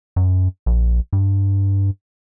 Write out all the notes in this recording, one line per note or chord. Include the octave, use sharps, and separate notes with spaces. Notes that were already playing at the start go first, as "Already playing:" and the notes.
F#2
A#1
G2